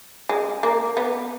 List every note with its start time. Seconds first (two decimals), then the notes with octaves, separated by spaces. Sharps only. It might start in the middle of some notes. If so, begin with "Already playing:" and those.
0.29 G#3
0.63 A#3
0.97 B3